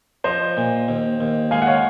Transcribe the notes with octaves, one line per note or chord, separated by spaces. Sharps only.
F3 C5 D#5
A#2
D#2
D#2
G#3 F5 G#5
F#5
C#5 F5